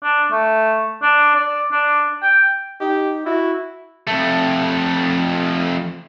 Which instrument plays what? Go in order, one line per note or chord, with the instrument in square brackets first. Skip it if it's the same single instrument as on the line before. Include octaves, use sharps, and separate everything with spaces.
[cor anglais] D4
A3
D4
D5
D4
G5
[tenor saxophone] D#4 [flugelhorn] G4
[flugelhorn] E4 [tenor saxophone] F#4
[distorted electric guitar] F2 A3